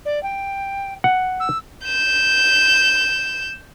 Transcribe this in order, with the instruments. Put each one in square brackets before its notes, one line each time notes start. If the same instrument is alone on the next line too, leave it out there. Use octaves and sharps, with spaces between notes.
[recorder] D5
G5
[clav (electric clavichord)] F#5
[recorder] E6
[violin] G6 E7